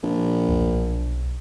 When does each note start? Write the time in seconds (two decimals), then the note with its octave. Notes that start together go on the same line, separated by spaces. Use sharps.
0.03 A#1
0.49 B1